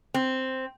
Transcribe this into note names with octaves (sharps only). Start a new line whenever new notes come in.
C4